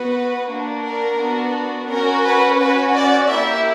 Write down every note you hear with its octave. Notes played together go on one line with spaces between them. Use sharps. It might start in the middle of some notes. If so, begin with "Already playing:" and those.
Already playing: B3 F#4 B4
A#3 D4 F#4
A#4
B3 D4 F#4
C#4 F#4 A#4
B4
C#4 F#4 B4
D5
A#3 E4 G4 E5